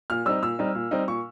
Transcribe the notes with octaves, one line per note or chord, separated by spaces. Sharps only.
A#2 F6
G3 C4 D#4 E6
A#2 E6
G3 C4 D#4
A#2
G3 C4 D#4
A#2 C#6